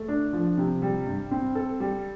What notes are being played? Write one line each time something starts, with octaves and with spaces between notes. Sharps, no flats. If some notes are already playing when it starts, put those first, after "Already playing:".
Already playing: A3
D4
F3
C3
G3
G2
C4
A4
G3